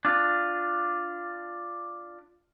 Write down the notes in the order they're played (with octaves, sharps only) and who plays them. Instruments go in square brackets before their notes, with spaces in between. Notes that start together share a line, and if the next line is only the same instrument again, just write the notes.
[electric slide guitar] D4 F4